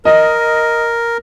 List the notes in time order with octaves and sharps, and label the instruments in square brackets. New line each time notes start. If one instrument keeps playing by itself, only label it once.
[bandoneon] A#4 [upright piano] D#5